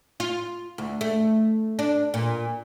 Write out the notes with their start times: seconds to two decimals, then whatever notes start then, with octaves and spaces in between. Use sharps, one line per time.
0.20 F4
0.78 D2
1.01 A3
1.79 D4
2.14 A#2